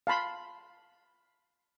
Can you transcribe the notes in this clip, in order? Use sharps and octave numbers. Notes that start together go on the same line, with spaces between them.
F5 A5 B5 C6